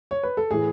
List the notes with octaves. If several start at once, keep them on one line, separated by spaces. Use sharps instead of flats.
C#5
B4
A4
A2 E3 G#4